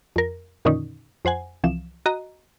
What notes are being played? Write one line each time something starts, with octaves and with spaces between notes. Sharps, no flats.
F2 A#4
F2 A#2 D3 D#3 C#4 D#4
F2 C5 F#5 G#5
C2 E3 F3 E7
F#4 D#5 A#5